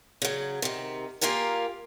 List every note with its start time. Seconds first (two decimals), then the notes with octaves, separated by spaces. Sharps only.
0.22 C#3 F#3
0.62 C3 D#3
1.21 A#3 F4 G4 A#4 G#5